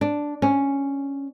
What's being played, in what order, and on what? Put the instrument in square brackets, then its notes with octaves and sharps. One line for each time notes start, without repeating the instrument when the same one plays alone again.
[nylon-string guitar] D4
C#4